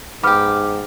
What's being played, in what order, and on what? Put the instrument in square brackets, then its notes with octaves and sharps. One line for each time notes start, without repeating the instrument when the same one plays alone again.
[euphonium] G#2 [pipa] B3 G4 [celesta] D6 F6